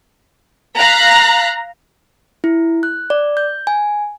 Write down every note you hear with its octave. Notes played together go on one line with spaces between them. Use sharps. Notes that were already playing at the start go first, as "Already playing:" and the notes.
F5 A#5 F#6 B6
E4
F#6
D5
G6
G#5